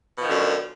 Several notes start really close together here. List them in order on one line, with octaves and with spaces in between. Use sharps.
B2 F3 D#3 D3 F#2